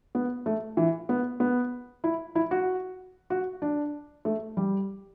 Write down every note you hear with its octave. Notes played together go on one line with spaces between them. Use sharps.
B3
A3
E3
B3
B3
E4
E4
F#4
F#4
D4
A3
G3